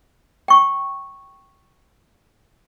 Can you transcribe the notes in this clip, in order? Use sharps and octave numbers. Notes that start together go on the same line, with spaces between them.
G5 C#6